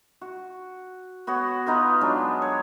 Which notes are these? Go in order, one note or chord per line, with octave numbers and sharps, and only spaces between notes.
F#4
B3 F#4 C#5
B3 D#4 F4 B4
F#3 G#3 D4
C#5